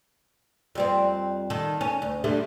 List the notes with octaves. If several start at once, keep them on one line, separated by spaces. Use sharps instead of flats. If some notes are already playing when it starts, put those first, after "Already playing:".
F2 G3 C4
D#3 A4
C#4
D2
D3 G3 A3